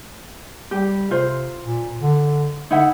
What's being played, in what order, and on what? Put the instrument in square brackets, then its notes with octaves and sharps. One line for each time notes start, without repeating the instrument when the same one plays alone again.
[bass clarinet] G3 [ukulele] G4
[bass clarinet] C3 [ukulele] F4 C5
[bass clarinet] A#2
D3
[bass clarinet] D3 [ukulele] D#4 E4 F#5